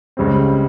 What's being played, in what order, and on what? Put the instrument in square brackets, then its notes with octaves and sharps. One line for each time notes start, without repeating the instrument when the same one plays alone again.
[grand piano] C#2 C#3 G3 C4